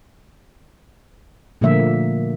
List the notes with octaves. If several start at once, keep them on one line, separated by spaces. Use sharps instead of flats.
A#2 D3 F3 A3 A#3 E5